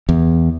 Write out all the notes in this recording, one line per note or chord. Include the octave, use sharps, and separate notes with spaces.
E2